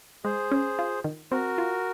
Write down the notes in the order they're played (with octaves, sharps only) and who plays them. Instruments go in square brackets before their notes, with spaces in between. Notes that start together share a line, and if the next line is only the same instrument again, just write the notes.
[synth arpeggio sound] G#3 [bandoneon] G#4 C5
[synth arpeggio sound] C#4
F4
D#3
[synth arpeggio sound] C4 [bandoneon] F#4 A#4
[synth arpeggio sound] F4